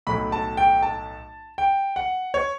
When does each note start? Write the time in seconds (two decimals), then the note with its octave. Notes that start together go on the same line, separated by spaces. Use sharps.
0.07 B1 A2 F#3 A3 B5
0.32 A5
0.57 G5
0.83 A5
1.58 G5
1.96 F#5
2.34 C#5